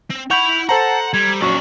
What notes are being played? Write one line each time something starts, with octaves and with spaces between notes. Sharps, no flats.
C4
E4 F#5 B5 C#6 G6 F7
A4 C5 F#5 A5 A#5
G3 G#6
A#1 F#3 C#4 D5 C#6